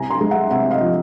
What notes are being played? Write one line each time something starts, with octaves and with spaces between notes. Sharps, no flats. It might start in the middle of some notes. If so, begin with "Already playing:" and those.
Already playing: C2 G#5 A#5
A#5 C6
G#3
E5 F#5
C3 E5 F#5
D#5 F5
F3